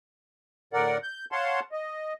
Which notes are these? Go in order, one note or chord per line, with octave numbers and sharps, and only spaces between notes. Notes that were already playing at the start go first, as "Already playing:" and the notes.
A2 D3 A#4 D5 F#5
G6
C#5 F5 F#5 A5 C6
D#5